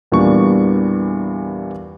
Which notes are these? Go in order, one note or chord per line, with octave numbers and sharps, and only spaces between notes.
E2 A#2 E3 G3 D4 C#6